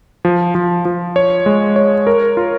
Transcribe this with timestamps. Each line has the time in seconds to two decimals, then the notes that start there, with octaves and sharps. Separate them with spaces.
0.25 F3
0.55 F3
0.85 F3
1.16 C#5
1.46 G#3
1.76 C#5
2.07 A#4
2.37 F4